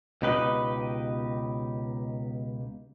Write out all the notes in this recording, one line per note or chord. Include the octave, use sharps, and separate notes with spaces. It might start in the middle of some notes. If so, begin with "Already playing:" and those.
C#2 B2 D#4 G4 B4 D#5